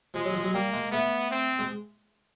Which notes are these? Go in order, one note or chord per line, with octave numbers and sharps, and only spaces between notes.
F3 G#3
F#3
F3
F#3
G3 A#3
G#3
A3 B3
C4
G#3